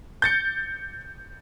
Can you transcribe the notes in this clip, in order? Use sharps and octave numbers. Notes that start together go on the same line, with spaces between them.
G6 A6 C#7